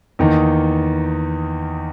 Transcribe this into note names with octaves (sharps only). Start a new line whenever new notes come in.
E2 D#3 A#3 D#4